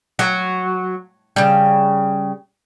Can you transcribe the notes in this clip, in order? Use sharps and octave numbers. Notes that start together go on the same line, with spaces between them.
F#3
C#3 G3